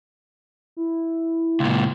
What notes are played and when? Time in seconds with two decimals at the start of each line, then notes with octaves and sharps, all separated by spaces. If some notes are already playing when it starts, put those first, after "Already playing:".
0.77 E4
1.60 C#2 A#2